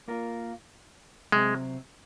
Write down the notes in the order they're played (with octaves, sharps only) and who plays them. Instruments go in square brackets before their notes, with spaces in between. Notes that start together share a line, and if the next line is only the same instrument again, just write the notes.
[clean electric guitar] A#3 F4 A#4
[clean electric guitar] C3 F#3 C4 [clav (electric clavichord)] G#3